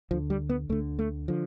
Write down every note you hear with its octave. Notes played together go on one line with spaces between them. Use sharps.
D2 D3 F3
G3
B3
D2 D3 A3
A3
D3 F3